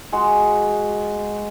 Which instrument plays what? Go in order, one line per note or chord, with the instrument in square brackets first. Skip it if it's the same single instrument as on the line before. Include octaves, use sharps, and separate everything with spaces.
[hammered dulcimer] G#3 F#4